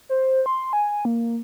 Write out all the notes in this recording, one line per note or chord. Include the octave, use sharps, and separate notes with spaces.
C5
C6
G#5
A#3